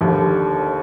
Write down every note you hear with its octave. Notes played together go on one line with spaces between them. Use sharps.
F1 D#2 D3 G3